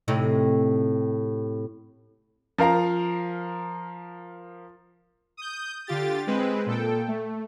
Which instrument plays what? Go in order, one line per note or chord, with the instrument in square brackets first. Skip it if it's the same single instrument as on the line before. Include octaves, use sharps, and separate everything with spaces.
[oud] A2 C3 D#4
[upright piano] F3 A#4 F5 A#5
[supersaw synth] D#6 G6
D3 F4 G4 A6
G#3 C4 B4
A#2 A4 G5
A3